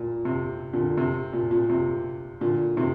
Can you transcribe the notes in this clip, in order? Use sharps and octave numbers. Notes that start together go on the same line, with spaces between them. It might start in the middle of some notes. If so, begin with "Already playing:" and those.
Already playing: A#2
C3
A#2 D3
C3
A#2
A#2
C3
A#2 D3
C3 D#3